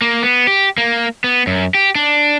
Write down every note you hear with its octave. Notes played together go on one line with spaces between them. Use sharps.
A#3
B3
G4
A#3
B3
F#2
G4
D4